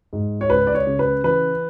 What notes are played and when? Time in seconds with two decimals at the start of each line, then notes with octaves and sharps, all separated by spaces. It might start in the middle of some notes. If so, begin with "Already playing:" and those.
0.13 G#2
0.41 C#5
0.49 C#2 B4
0.67 D5
0.75 C#5
0.87 C#3
0.99 B4
1.24 E3 B4